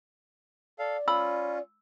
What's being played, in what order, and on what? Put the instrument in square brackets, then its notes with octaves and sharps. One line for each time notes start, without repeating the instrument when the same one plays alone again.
[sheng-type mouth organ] A4 F5 [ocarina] D5
[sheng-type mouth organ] C#4 F4 [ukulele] B5 [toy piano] E6